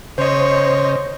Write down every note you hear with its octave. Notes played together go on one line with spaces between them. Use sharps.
C#3 C5 C#5 D#5